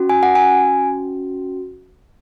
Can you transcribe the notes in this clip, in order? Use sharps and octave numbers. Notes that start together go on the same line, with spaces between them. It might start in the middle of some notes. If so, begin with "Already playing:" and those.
Already playing: C#4 F#4
G#5
F#5
G#5